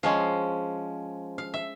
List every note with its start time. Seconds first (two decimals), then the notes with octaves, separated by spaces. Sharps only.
0.03 F3 G#3 C#4 F5
1.38 F5
1.54 E5